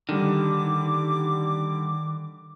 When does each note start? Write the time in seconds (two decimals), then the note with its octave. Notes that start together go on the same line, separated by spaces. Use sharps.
0.09 D3 D#3 G3 D6